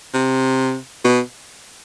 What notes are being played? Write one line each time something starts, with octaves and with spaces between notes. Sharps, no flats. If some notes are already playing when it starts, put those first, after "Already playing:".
C3
B2